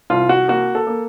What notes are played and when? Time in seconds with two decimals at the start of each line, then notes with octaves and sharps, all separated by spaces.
0.10 C2 F4
0.29 F#4
0.48 A#3 F#4
0.75 A4
0.87 A#3